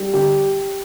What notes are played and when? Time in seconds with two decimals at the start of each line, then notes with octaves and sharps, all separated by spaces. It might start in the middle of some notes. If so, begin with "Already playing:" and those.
Already playing: G3
0.13 D3 G4